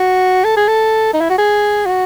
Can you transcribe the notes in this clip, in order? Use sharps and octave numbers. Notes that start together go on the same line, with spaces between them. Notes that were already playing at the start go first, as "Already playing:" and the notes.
Already playing: F#4
A4
G#4
A4
D#4
E4
F#4
G#4
F#4